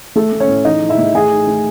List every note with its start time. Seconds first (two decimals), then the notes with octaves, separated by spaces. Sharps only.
0.16 A3 A4
0.33 A3
0.40 C#4 C#5
0.48 A2
0.65 E3 D#4 D#5
0.82 E3
0.89 E4 E5
0.98 A2
1.14 A3 G#4
1.32 D#4
1.47 A3